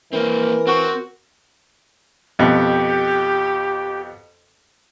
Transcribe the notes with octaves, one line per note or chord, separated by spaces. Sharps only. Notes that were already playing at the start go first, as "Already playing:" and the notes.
E3 A#3 C4 A#4
C4 F#4
F2 B2 G4